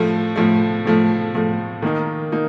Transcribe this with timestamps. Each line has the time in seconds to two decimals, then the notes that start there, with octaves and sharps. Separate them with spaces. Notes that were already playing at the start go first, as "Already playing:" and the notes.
Already playing: A2 F3 A3
0.36 A2 F3 A3
0.85 A2 F3 A3
1.34 A2 F3 A3
1.82 D#3 A#3 D#4
2.32 A#3 D#4